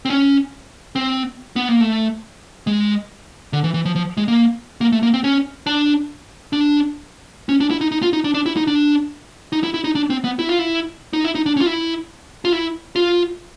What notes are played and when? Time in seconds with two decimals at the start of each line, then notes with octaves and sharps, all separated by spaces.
0.05 C4
0.10 C#4
0.95 C4
1.56 B3
1.69 A#3
1.81 A3
2.67 G#3
3.53 D3
3.64 E3
3.74 E3
3.85 F3
3.96 F3
4.17 G#3
4.28 A#3
4.81 A#3
4.92 A3
5.03 A#3
5.14 C4
5.24 C#4
5.66 D4
6.53 D4
7.49 C#4
7.60 D4
7.71 E4
7.81 D#4
7.92 D#4
8.02 F4
8.13 D#4
8.24 D4
8.34 D4
8.46 E4
8.57 D#4
8.67 D4
9.53 D#4
9.64 E4
9.74 E4
9.84 D#4
9.95 D4
10.10 C4
10.24 B3
10.39 E4
10.49 F4
10.59 E4
11.13 D#4
11.24 E4
11.35 D#4
11.46 D4
11.57 C#4
11.61 F4
11.67 E4
12.45 F4
12.53 E4
12.96 F4